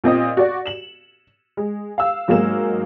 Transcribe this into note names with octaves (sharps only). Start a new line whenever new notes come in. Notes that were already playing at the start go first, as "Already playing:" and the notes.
A#2 C4 D#5 D#6
F#4 D5
E7 F#7
G#3
F5 E6
G#2 F#3 G#3 A#3 E7